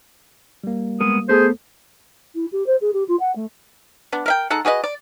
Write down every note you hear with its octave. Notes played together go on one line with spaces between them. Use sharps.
G3 A#3
G#3 B3 A#4 D#6
A3 B3 G#4 A4 C5
E4
G4
C5
G#4
G4
F4
F#5
A3
B3 D4
A#4 E5 G5
G#3 D#4 A4 F#5
F#4 G#4 B4 D#5
D5